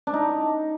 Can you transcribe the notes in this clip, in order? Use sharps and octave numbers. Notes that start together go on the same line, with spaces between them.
D4
D#4